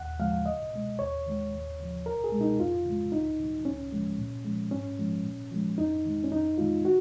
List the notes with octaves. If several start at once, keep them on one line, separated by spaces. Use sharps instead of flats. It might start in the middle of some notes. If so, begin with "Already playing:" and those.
Already playing: D#2 F#5
C#3 F3 G#3 F5
C#2 D#5
B2 G#3
D#2 C#5
D#3 G#3
D#2
C#3 F3
C#2 A#4
G#4
G#3
B2 D#4
F2 F4
C#3 G#3
C#2 D#4
C#3 F#3
C#2 C#4
C#3 F3 G#3
A#2
F3 G#3
G#2 C#4
F3 G#3
A#2
F3 G#3
F2 D#4
D#3 G#3
C#4
F2 D#4
D#3 G#3 F4
F#4